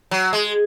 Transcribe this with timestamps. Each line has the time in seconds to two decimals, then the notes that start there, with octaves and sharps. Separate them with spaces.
0.11 F#3
0.33 G#3